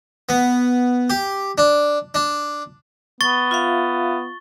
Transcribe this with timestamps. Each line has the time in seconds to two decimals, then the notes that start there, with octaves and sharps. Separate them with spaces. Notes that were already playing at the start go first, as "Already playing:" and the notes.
0.29 B3
1.10 G4
1.58 D4
2.15 D4
3.21 B3 C#6 A6 G7
3.51 F4 E5 F5